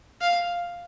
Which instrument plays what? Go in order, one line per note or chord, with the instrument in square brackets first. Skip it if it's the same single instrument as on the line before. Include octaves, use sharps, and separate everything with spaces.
[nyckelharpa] F5